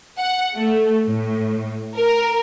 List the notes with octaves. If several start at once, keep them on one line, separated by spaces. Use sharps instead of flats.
F#5
A3
A2
A#4